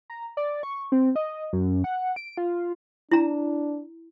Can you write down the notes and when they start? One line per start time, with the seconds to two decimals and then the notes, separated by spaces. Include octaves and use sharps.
0.10 A#5
0.37 D5
0.63 C#6
0.92 C4
1.16 D#5
1.53 F#2
1.84 F#5
2.16 D7
2.37 F4
3.11 D4 E4 A#5